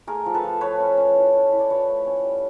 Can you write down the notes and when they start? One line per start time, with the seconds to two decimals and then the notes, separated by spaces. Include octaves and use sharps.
0.07 A3 G#4 A#4
0.26 F3
0.34 A4 B4
0.44 F3
0.61 F3 B4 C#5
0.79 C#4
0.97 C#4
1.16 E4
1.33 E4
1.52 E4
1.59 D5
1.70 F3 B4 C#5
1.88 A3
2.06 C#4
2.24 G3